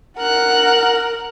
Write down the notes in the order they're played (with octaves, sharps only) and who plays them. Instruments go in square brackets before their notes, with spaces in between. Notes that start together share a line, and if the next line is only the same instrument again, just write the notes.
[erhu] A#4 [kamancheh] F#5 F#6